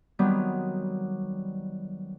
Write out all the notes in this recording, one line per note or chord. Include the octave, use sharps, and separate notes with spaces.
D#3 F#3 G3 B3 C4